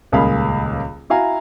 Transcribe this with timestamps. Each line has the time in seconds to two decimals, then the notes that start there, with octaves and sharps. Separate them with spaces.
0.12 D#1 C#2 A#3 G#4 F5 B5
1.10 E4 F#4 F5 G#5 A#5